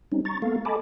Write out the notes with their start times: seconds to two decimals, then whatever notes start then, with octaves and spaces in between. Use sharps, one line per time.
0.12 G3 C4 C#4 D#4
0.25 A#5 C#6 A6
0.42 G#3 A#3 B3 A4 F5
0.65 A4 D#5 G#5 A5 B5 D6